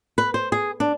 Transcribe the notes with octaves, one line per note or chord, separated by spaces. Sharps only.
B4
C5
G#4
D4